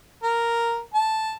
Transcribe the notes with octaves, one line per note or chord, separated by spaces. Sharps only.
A#4
A5